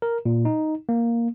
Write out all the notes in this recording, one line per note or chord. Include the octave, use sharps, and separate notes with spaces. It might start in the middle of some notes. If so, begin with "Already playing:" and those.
A#4
A#2
D#4
A#3